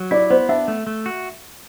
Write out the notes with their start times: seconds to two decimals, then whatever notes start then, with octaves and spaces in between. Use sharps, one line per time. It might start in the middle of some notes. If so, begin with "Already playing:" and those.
Already playing: F#3
0.11 E4 D5
0.30 B3 C5
0.49 D4 E5
0.68 A3
0.87 A3
1.06 F#4